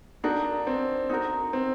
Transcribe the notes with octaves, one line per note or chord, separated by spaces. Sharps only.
D4 D#4 F#4 A#4
C4
D#4 F#4 A#4
C4